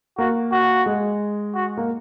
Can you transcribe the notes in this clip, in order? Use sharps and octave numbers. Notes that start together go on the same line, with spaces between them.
A#3 F#4
F#4
G#3
F#4
A#3